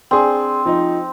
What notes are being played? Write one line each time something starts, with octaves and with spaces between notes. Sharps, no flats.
C4 D4 G#4
F3 D#4